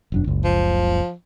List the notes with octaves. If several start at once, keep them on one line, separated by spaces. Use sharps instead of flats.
E1 F#2 D4
F#1 C#2
F3